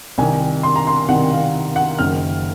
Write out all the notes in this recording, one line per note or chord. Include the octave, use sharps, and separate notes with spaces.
C2 C3 D#3 G#5
C6
A#5
C6
C2 C3 D#3 F#5
F5
F#5
F#1 F#2 D#3 F6